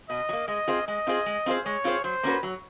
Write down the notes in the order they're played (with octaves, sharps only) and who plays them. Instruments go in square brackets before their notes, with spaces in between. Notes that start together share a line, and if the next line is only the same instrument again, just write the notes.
[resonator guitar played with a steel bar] B2 [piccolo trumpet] D#5
[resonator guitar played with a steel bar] F#3
A#3
[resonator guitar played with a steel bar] G#3 [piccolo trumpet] D#5
[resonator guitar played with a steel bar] C4 F4 G#4 C5
[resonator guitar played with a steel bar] G#3 [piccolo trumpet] D#5
[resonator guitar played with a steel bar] C4 F4 G#4 C5
G#3
C4 F4 G#4 C5
[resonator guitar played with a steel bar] G#3 [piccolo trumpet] C#5
[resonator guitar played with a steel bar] C4 F4 G#4 C5
[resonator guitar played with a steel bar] F#3 [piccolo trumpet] C5
[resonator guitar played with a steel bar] A#3 C#4 F#4 B4
F#3